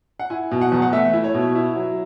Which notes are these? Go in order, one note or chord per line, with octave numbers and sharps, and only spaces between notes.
F#5
E4 G#5
B2
F#5
E2
F#5
A3 E5
E4
C#5
B2
E4
F#3